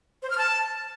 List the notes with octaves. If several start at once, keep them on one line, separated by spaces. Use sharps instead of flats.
C5
F6
A5